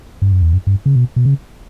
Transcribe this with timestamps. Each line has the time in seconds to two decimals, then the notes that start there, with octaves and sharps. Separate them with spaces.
0.22 G2
0.32 F#2
0.42 E2
0.53 F#2
0.67 G2
0.86 C#3
0.96 B2
1.16 B2
1.25 C#3